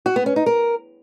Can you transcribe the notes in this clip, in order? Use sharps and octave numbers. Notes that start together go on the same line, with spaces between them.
F#4
B3
C#4
D#4
A#4